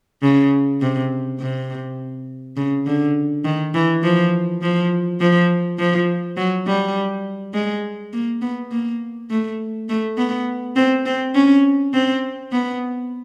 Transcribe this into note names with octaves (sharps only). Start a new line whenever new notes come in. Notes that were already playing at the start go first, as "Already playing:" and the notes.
C#3
C3
C3
C#3
D3
D#3
E3
F3
F3
F3
F3
F#3
G3
G#3
A#3
B3
A#3
A3
A3
B3
C4
C4
C#4
C4
B3